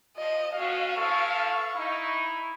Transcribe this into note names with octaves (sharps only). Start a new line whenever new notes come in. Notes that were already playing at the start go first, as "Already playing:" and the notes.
F3 D#5
A3 C4 C#4 F#4 F5
E3 F3 A4 C#6
D#4 E4